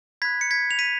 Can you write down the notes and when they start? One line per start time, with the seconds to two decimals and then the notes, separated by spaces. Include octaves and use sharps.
0.22 B5 F#6 G#6 B6
0.41 C#7
0.51 G#6 B6
0.71 F7
0.79 B6 D#7